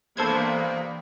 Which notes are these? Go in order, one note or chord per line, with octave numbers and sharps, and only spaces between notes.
G2 C3 E3 A#3 B3 A4 C5 G#6